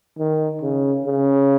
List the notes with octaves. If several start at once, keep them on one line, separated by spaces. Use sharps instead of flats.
D#3
C#3
C#3